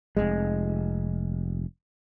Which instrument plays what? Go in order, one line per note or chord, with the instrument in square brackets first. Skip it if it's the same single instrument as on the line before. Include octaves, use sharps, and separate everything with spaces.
[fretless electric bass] F1 C2 G#3